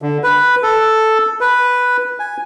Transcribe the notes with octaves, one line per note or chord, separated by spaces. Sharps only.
D3
B4
A4
B4
G#5